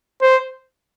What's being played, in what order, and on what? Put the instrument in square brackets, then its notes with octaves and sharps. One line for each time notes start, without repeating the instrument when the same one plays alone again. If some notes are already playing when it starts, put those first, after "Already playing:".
[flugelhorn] C5